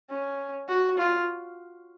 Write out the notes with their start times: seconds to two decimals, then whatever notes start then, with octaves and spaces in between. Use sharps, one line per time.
0.10 C#4
0.69 F#4
0.98 F4